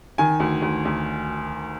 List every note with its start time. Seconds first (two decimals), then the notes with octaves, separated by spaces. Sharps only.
0.18 D#3 G#5
0.40 D2
0.62 D2
0.85 D2